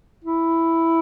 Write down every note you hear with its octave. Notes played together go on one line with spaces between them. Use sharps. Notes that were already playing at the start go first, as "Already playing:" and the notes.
E4